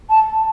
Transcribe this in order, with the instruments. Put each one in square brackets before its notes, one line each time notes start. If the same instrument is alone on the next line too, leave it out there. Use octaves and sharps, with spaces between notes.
[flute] A5